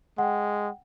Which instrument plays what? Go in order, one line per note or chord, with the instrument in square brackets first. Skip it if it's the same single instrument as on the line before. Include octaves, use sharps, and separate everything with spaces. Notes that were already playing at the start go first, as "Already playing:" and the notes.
[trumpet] G#3 [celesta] F#5 G5